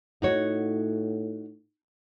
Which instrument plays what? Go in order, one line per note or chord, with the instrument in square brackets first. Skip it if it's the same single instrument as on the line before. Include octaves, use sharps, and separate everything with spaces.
[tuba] A2 [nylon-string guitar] D#4 F#4 C#5